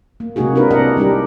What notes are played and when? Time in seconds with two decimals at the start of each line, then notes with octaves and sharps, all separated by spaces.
0.20 A#3
0.36 C3 G#3 A#3 D#4 F#4 G#4
0.55 C4 D4 E4 A#4 B4
0.71 D4 A#4 D#5 F#5
0.97 G3 D4 D#4 G4